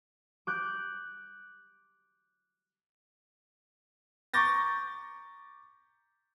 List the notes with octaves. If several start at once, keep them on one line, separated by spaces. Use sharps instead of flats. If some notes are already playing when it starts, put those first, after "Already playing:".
D6 F#6 G6
A#5 C#6 D6 G6 A6 A#6